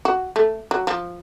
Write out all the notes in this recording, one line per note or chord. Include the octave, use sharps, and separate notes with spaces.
F#4
A3
F#3
F3